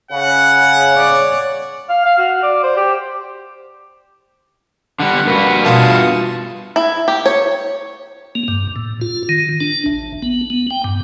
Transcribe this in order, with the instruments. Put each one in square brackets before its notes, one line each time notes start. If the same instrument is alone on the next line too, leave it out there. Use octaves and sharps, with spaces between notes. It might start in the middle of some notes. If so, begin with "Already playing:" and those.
[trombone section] C#3 [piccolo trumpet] F#5
[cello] C#5 D5
[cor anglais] F5
F5
F#4
D5
C5
G4
[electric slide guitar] D3 G3 [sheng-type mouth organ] F#5
[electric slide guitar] G2 F#4 [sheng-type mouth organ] A#3 B4
[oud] E2 B2 F4 [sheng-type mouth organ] F5 A5 D#6
[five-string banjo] E4
G4
C#5
[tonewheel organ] A#3
G2
A2
F4
D#3
D4
A1
B3
B3
G5
G2